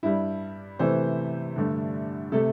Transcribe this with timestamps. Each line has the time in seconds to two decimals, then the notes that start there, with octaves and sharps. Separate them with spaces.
0.03 G2 G3 E4
0.79 C3 E3 A3 C5
1.56 G2 D3 A3
2.32 C3 A3 A4